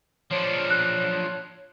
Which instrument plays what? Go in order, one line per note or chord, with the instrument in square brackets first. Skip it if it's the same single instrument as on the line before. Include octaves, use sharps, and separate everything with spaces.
[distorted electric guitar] F3 D4 [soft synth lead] C#5
[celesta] F#6